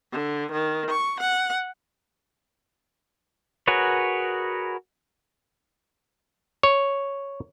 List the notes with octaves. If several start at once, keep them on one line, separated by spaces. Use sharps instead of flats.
D3
D#3
C#6
F#5
F#4 G#4 A#4 B4 C#5
C#5